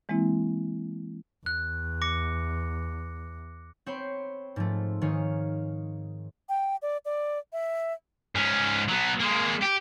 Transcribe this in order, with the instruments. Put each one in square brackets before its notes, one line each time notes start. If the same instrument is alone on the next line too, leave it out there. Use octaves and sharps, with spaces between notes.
[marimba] E3 G#3 A#3 C4 E4
[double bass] E2 [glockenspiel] F#6
[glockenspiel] D6 A#6 C#7
[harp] C4 C#5 G5 B5 C6
G#2 F3 A3
G#2 D#3 G#4 C#5 F5
[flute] G5
D5
D5
E5
[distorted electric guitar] G#2 C#4
F#3 B3
G#3 A#3
G4